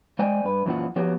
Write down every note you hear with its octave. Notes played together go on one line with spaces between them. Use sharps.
G#3 C5 D5 G5 G#5
G2 B4
F#2 A#2 E3 C4 F4 F#5
F3 F#3 B3 F#4 G4